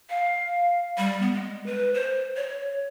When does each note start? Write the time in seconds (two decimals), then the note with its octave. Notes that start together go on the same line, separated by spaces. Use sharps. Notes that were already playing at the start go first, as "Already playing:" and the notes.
0.10 F5
0.98 G3
1.22 B3
1.34 G#3
1.66 B4
1.94 C5
2.36 C#5